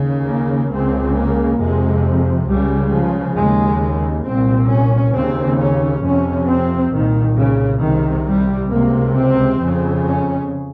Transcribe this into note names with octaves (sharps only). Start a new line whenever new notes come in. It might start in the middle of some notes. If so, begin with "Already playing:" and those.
Already playing: D#2 C#3
A#3
C#2 C#3 C4
A#3
F2 C3 G#3
C#2 C#3 G3
F3
D#2 C#3 G#3
C2 A#2 C4
C#4
D#2 C#3 C4
C#4
F2 C3 C#4
C4
C2 A#2 D#3
C#3
C2 C3 D#3
G3
C#2 C3 A#3
C4
F2 C#3
C#4